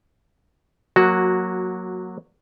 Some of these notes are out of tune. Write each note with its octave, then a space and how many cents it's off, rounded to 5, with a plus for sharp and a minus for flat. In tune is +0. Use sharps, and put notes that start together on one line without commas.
F#3 -15 A#3 +0 F#4 +0